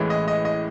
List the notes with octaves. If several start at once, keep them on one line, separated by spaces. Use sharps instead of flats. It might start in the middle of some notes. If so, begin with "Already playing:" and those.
Already playing: A1 A2 E3 G#3
D#5
D#5
D#5